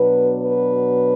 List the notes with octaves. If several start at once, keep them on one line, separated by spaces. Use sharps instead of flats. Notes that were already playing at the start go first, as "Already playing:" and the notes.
Already playing: B2 F#3 B3 D4 B4
B4